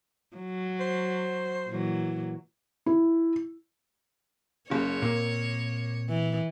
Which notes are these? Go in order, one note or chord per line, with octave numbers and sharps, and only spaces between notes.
F#3
C5
A#2 E3 F#3
E4
F#1 C#3 C#5
A#2 A#3 C4
E3